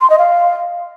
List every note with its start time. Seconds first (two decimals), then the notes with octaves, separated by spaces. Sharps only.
0.01 C6
0.10 D#5
0.19 F5